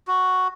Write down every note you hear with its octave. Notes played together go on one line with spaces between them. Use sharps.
F#4